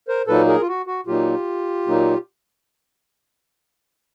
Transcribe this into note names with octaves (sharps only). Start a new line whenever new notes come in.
A#4 C5
A#2 F#3 A#3 D#4 A4 B4
G#4 A#4
F4
F#4
F#4
A#2 F#3 A#3 D#4 F4 G4
A#2 F#3 A#3 D#4